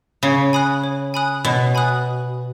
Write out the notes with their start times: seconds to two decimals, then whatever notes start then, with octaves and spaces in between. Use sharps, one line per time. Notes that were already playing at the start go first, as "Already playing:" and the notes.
0.23 C#3 C#5
0.53 G#5 B5 D#6 F#6
0.84 C#5
1.14 G#5 B5 D#6 F#6
1.45 B2 C#5
1.75 G#5 B5 D#6 F#6